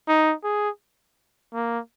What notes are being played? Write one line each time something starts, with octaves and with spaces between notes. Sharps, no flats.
D#4
G#4
A#3